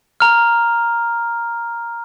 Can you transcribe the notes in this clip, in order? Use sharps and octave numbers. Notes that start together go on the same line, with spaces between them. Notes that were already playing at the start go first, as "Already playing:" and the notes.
A#5 F6